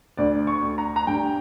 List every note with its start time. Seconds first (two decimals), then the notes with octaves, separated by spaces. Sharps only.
0.17 D2 D5
0.47 C#6
0.63 D2
0.78 A#5
0.96 A#5
1.07 G2 G5